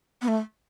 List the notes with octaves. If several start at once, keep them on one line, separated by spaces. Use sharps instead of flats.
B3
A3